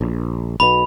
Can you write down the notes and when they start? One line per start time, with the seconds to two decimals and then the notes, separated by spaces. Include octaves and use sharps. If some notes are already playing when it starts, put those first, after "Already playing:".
0.01 A#1
0.60 B1 B2 B5